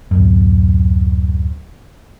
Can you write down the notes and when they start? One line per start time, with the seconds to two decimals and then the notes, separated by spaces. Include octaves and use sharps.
0.11 D1 F#2